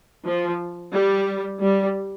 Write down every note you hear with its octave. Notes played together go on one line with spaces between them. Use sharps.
F3
G3
G3